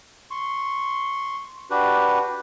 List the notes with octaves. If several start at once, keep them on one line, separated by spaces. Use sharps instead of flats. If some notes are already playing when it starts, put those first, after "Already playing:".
C6 C#6
D4 F#4 G4 B4